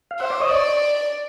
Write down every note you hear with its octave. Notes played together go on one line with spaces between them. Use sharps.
F5
C5 E5 F#5
D5 E5
C#5 D#5
D5